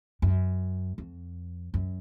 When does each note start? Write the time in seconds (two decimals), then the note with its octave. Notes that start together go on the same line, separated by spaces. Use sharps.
0.22 F#2
0.98 F2
1.74 F#2